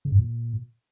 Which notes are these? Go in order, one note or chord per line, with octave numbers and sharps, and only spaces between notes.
C#3
G2
A#2